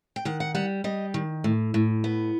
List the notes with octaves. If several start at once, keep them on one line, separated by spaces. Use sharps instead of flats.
G5
D#3 F#5
F#5
G3 F#5
G3 D#5
D#3
A2
A2
B3